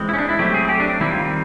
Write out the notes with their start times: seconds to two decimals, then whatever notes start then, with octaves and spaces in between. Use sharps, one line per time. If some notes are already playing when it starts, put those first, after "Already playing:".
Already playing: E3 G#3 C4
0.09 E4
0.14 C#4
0.18 D4
0.29 E4
0.39 F#3 A3 C4 G4
0.54 G#4
0.69 G4
0.80 D4
1.00 D#3 G3 C4 E4
1.11 F4